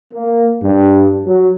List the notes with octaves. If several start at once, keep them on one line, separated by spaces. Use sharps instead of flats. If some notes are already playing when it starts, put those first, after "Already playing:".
A#3
G2
F#3